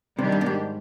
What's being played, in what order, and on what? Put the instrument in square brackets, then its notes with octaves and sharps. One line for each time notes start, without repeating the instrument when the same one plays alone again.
[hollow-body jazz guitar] C3 [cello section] D#3 G3 D4 G4
[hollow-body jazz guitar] G2
B2
G#2